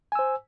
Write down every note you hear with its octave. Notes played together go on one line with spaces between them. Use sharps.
C5 G#5 E6